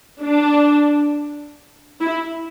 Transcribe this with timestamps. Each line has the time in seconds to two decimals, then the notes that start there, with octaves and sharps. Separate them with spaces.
0.22 D4
2.01 E4